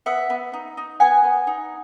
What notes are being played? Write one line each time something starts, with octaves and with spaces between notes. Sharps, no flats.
B3 E5 F#5
B3
D#4
D#4
B3 F#5 G#5
B3
D#4